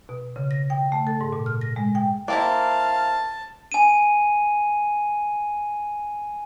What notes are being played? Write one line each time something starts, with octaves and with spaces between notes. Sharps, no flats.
B2
C#3
A#6
G5
A3
A4
G#2
A#2
F6
A#6
G#3
G5
A#3 C4 E4 F5 A5
G#5 D#7